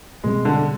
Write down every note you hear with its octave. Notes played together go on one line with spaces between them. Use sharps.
E2 B2 G3 G#3 C4
D3